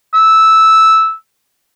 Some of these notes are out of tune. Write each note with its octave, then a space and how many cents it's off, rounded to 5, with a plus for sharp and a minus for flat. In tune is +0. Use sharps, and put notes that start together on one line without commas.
E6 -10